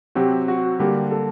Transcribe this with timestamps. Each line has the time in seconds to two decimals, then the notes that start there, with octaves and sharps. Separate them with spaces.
0.15 C3 F#3 C4 F#4 G4
0.48 F#4
0.79 D3 G3 A#3 G4
1.11 A4